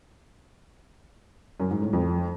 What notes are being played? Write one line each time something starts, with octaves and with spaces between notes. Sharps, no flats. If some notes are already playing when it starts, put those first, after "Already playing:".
F#2
G#2
A2
F2